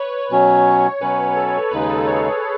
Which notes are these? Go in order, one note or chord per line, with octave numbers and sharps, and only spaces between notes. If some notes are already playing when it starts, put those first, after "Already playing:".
Already playing: B4 C#5
B2 F#3 C#4
B2 F#3 C#4 B4
A4
C#5
D#2 C#3 G#3 D#4 B4
G#4
A4
B4
C#5